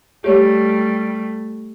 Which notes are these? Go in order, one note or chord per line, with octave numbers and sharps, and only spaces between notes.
G3 A3 G4 C#5 D5